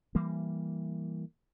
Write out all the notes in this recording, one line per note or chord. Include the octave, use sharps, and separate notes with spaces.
E3 G3 A#3